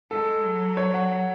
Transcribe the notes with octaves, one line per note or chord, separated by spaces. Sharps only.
G#3 A4
F#3
C#5
F#5